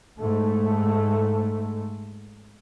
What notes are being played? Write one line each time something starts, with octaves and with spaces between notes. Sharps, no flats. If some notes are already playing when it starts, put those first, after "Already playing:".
G#2 A3